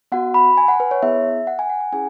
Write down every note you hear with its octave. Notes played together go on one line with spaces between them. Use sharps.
B3 F#4 F#5
B5
G#5
F#5
B4
C#5
B3 E4 G#4 E5
F#5
G#5
F#5
F#5
C#4 E4 G#4 G#5